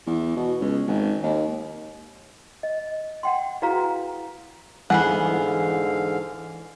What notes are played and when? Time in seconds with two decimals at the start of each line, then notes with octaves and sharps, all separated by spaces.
0.07 E2
0.36 B2
0.61 C#2
0.87 G#1
1.23 D#2
2.63 D#5
3.23 F#5 G5 C6
3.62 E4 F#4 G#4 B4 F5 A#5
4.90 G#2 D3 E3 B3 G#4 F5 F#5